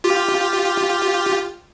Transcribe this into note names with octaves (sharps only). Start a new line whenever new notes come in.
F4 G4